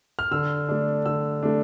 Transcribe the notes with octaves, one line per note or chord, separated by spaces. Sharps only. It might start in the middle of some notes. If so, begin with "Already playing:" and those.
F6
D3 E6
A3 D4
D3 E6
A3 D4